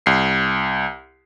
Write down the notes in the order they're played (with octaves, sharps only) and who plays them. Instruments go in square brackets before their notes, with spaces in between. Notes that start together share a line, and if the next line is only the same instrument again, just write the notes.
[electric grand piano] C2 C7